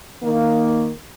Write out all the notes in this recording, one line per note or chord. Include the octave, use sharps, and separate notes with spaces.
D#3 A#3